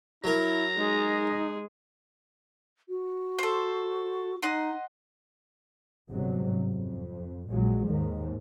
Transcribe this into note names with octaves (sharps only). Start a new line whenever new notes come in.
F#3 E4 A#4 A#5
G#3 D#4 G#4
F#4
A4 C5
D#4 D#5 F#5 C6
G1 G#2 C3 F#3
F2
A#1 A#2 F#3 G#3
D#2 G#2 D#3